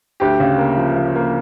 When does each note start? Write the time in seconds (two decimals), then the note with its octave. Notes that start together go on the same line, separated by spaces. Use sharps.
0.20 D2 G4
0.40 C#3
0.58 A#3
0.77 F3
0.96 F3
1.15 A#3